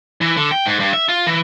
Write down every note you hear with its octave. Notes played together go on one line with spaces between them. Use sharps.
E3
D3
G5
G#2
G2
E5
F4
E3